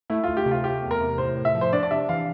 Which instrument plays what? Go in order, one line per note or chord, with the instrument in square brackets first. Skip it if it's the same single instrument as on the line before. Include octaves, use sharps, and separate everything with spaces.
[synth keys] A3 [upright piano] E4
[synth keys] D2 [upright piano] F4
[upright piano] G4
[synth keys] C3
[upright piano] F4
[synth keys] A3 [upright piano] G4
[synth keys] E2
[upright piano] A#4
[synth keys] C3
[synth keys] A2 [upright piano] C5
[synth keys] A2
[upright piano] E5
[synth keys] F3
[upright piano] C5
[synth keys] D4 [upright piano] D5
[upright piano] D5
[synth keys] C3 [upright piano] E5
[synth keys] E3 [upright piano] F5